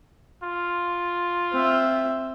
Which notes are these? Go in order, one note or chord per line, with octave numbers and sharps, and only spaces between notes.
F4
C4 E5